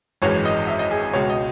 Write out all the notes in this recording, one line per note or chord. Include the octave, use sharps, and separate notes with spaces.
G#1 F#2 E3 G#3 C#5
D#5
E5
D#5
G#4
G#4
C#2 B2 G#3 C#5
D#5